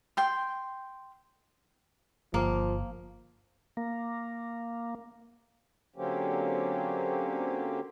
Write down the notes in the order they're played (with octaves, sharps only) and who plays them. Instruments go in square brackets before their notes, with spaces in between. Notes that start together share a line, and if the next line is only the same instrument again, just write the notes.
[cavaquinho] G5 C6
[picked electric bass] G1 [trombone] F3 [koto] A#3
[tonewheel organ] A#3
[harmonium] D3 F#3 A#3 C4 C#4 G4